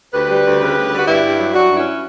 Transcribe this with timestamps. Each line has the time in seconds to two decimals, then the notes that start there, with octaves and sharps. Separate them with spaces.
0.13 D2 G4 B4
0.29 G3
0.45 D2
0.61 C#3
0.76 D2
0.92 G3
0.99 F#4
1.07 G2 E4 G4
1.23 G2
1.39 F#3
1.54 F#3 D4 F#4
1.70 G2
1.77 C#4 E4